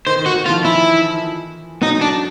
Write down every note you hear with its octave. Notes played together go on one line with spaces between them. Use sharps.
D#3 C5
D#3 F#4
D#3
F4
F3
E3 E4
F#3 D#4
D4